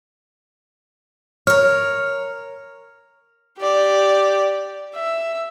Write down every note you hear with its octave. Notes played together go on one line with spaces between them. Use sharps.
A#4 C#5 F6
G4 D5
E5